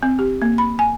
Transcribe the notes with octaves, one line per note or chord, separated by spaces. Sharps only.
C4
G4
A#3
B5
G#5